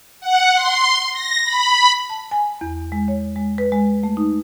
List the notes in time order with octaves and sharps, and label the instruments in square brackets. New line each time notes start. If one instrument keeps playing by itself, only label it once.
[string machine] F#5
C6
A#6
B5
[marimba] A5
G#5
E2
G#3
C#5
G#3
B4
G#3
A3
D#4